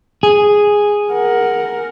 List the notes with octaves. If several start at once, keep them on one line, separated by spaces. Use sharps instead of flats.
G#4
A#4 F#5